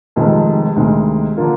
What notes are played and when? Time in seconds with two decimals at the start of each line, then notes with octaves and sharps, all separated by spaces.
0.16 F1 F2 C3 D#3 G#3
0.76 D2 C3 D#3 G#3
1.37 D3 F3 A#3 F4